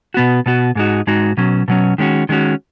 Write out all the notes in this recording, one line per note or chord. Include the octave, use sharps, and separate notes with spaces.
B2 B3 F#4
B2 B3 F#4
G#2 G#3 D#4 F#4
G#2 G#3 D#4 F#4
B2 F#3 C#4
B2 F#3 C#4
D#3 G#3 C#4 F#4
D#3 G#3 C#4 F#4